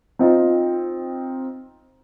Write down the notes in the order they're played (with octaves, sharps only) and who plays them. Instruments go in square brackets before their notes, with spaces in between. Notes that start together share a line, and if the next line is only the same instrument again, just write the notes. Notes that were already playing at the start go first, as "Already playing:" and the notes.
[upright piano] C4 D#4 F4